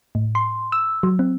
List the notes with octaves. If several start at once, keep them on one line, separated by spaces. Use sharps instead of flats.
A2
C6
E6
F#3
C4